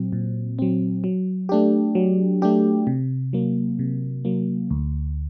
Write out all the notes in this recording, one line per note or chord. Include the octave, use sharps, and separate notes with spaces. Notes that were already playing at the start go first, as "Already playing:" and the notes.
Already playing: A#2 F#3 C4
A#2
F#3 C4
F#3
A3 D4 G4
F#3
A3 D4 G4
C3
F#3 A#3
C3
F#3 A#3
D2